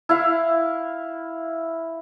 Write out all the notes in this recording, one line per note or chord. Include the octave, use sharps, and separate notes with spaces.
E4 F5